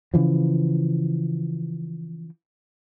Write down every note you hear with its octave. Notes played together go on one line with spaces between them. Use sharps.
C#3 E3 F3